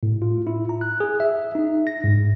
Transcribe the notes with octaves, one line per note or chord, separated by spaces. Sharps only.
A2
F4
E4
A#5
F#6
G#4
E5
D#4
A#6
G#2